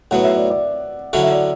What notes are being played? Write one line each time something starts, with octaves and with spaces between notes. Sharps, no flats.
A2 F#3 B3 F#5
E5
D5
D5
D3 F#3 C#4 E4 A4 F#5
E5
D5